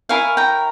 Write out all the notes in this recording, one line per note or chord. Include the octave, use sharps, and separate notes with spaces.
E4 A#4 C#5 F5 G#5
G5 A#5